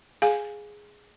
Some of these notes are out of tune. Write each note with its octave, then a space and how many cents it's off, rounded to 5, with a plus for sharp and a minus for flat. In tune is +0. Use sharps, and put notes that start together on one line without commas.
G#4 +0 F5 +15 G#5 +0